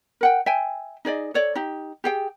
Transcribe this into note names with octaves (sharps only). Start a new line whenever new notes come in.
A#4 F#5 G5
E5 G5 G#5
D#4 G#4 D5 D#5
A4 C#5 D5
D#4 G4
G4 G#4 G5